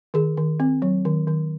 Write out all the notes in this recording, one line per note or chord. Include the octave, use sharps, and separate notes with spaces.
D#3 G#4
D#3
C4
F#3
D#3
D#3